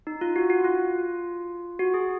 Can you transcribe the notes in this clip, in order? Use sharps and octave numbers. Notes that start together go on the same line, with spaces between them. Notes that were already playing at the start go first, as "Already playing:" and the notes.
D#4
F4
F#4
F#4
F4
F#4
G#4